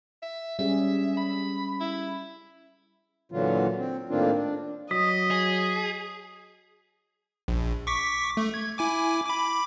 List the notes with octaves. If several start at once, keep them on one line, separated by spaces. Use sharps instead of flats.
E5
G3 C#4 G#4 E5
B5
E4
A#2 D3 E3 F#3 F4
C4
A2 D#3 A#3 C4 D4 F4
D4
F#3 D#5 D#6 B6
G#4
A#1
C#6 D6 B6
A3
G#6
E4 G#5 D6
B5 D6